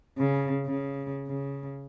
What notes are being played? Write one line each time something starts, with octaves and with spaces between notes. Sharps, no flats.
C#3
C#3
C#3